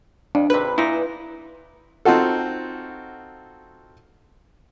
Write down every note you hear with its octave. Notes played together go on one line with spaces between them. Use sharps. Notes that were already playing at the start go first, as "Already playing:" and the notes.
F2 D4
G#1 C3 B4
A#2 D#4 E4
C4 D#4 F4 F#4 A4